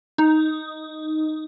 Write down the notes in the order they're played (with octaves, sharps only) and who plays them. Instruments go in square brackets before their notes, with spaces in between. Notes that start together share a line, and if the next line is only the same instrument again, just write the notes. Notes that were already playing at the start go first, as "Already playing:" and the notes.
[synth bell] D#4